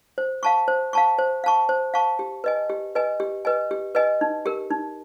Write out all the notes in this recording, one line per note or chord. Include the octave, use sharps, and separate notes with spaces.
C5
F5 A5 C#6
C5
F5 A5 C#6
C5
F5 A5 C#6
C5
F5 A5 C#6
G4
B4 D#5 G#5
G4
B4 D#5 G#5
G4
B4 D#5 G#5
G4
B4 D#5 G#5
D#4
G4 A#4
D#4